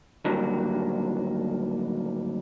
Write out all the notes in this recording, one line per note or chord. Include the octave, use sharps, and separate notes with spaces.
A2 D3 D#3 F#3 G3 A#3